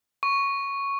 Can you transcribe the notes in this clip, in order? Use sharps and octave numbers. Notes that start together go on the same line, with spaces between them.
C#6